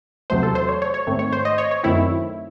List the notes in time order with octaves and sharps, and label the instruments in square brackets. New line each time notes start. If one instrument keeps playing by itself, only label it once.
[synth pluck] E2 C3 F#3 A3 C5
A4
C5
C#5
C#5
C#5
G#2 D#3 A3 C4
C#5
C5
D#5
C#5
C#5
F#2 D#3 A3 C4 E4